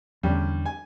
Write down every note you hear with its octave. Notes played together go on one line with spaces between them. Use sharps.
E2 D3 G3 C#4 D4
G#5